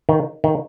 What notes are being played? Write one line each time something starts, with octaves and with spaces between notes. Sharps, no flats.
D#3
D#3